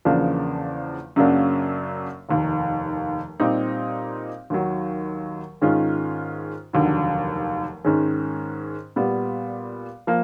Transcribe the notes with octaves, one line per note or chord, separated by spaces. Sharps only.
E2 C#3 F3 A#3 D4
F#2 C#3 F#3 A#3 D4
F1 D#2 D#3
A#2 G3 C4 D#4 G4
D#2 D#3 F#3
G#2 D#3 G#3 C#4 F4
F1 D#2 D3 F#3
G#2 D#3 G#3 C#4
A#2 G3 B3
F3 A#3